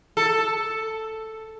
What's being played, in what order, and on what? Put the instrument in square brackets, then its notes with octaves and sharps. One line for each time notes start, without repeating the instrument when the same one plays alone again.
[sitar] A4